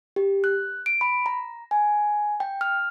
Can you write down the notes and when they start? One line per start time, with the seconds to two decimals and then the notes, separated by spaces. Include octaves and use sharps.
0.16 G4
0.44 F#6
0.86 D7
1.01 B5
1.26 A#5
1.71 G#5
2.40 G5
2.61 F6